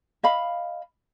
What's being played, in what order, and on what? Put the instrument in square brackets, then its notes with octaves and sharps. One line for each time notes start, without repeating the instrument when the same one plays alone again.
[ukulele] D#5 F5 B5